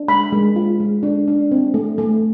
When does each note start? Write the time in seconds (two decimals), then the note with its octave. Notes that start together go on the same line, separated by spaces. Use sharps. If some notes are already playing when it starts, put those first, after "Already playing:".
Already playing: D4
0.08 G#3 B5
0.32 G#3
0.56 F4
0.80 G#3
1.03 D4
1.28 D4
1.51 C4
1.74 A3
1.98 A3